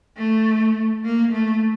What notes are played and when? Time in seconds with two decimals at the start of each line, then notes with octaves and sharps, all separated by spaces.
0.17 A3
1.04 A#3
1.32 A3